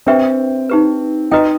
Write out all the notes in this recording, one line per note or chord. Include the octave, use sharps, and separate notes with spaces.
C4 D4 G4 B4 E5 G5
D#4 G4 B4
D#4 F#4 B4 D#5 G5